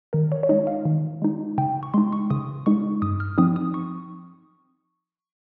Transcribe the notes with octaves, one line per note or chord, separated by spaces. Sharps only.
D#3 A#4
C#5
C#5
G#3 D#4 D#5
F5
D#3
G#3 D#4
C#3 G5
C#6
G#3 D#4 C6
C#6
C#3 D#6
G#3 D#4 C#6
G2 D#6
F6
F3 C4 D#4 D#6
D#6
C#6